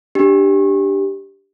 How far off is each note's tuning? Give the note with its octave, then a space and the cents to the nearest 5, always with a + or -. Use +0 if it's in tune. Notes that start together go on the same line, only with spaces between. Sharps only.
D4 +0 G4 +0